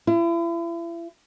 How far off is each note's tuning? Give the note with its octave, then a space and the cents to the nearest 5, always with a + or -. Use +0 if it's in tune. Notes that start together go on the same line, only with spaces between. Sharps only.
E4 +40